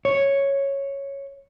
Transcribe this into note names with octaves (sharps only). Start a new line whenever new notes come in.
C#5